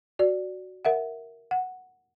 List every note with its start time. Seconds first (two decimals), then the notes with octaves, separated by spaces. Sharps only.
0.19 F#4 D5
0.85 A#4 E5 F#5
1.51 F#5